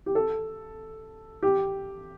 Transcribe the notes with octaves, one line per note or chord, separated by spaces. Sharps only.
G4
A4
G4